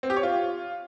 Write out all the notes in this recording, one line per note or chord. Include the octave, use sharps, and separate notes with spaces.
C4
G4
C#5
F4